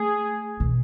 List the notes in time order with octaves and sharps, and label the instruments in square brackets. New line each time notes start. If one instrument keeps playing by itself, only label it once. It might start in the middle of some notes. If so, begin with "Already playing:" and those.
Already playing: [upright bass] A3 [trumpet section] G#4
[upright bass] B2